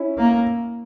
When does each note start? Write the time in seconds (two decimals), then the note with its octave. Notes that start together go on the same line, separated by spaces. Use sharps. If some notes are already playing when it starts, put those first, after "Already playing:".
Already playing: C#4 E4
0.18 A#3